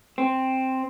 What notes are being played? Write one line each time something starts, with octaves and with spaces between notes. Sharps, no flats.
C4